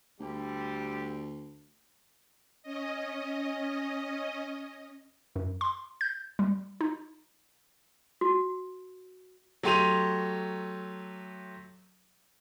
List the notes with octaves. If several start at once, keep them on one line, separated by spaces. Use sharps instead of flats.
D2 D3 G3 G4
C#4 D#5
F#2
C6
G6
G3
D#4
F#4
F#3 A3 G4 C6 D#7 F7